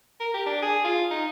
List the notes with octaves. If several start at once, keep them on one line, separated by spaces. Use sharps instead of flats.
A#4
G4
D4
G#4
F4
D#4